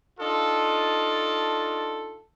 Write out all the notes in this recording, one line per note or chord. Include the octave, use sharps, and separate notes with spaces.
D4 D#4 F4 A4